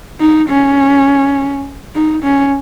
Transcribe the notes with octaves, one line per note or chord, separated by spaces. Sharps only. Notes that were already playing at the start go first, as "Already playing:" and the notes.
D#4
C#4
D#4
C#4